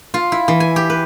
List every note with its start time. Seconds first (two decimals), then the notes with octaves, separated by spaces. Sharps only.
0.14 F4
0.32 E4
0.48 E3
0.60 G#5
0.76 G4
0.90 B4